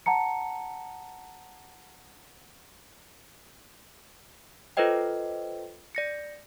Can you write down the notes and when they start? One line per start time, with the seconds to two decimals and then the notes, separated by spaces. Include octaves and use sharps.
0.06 F#5 A5 A#5 C#7
4.77 F4 A4 B4 C5 D#5 G5
5.95 D5 A#6 C#7